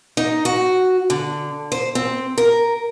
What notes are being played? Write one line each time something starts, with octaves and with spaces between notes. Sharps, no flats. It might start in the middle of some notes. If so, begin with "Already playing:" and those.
D#4
F#4
D3
C5
C4
A#4